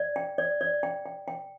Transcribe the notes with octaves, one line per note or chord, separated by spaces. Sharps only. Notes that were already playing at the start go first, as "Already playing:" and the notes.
Already playing: D5
G5
D5
D5
G5
G5
G5